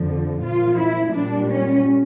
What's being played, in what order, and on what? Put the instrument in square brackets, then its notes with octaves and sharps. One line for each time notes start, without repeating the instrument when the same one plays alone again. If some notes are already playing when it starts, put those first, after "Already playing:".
Already playing: [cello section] F2 D3 F3
A#2 F3 F4
E4
A#2 G3 D4
C#4